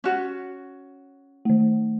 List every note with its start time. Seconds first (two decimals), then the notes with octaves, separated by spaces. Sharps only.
0.04 C#4 F#4
1.45 D#3 A3